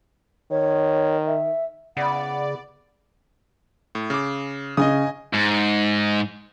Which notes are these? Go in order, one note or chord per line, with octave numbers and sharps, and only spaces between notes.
D#3 C#5
E5
C#3 B3 E4 D5 F#5
A2
C#3 D6
C#3 D#5 G#5 D#6
G#2